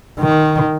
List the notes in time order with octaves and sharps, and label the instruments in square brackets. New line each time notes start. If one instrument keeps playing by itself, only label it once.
[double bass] D#3